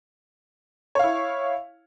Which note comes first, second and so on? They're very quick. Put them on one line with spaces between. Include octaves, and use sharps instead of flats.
C#5 F5 E4